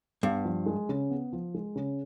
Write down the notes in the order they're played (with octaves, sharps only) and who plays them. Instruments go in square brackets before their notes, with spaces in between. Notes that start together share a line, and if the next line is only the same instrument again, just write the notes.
[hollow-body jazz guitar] G2 [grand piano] B3
[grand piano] F3
G#3
C#3
B3
F3
G#3
C#3